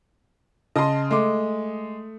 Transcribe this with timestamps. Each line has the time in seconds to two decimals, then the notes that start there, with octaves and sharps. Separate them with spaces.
0.75 C#3 D#5 A5 C6 D#6
1.11 G#3 A3 D6